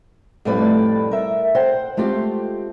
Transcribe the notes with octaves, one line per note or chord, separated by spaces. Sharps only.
F2 A2 G3 A3 B4 D5
A#4 E5
C5 F#5 G5
G#3 A3 C4 F4 G4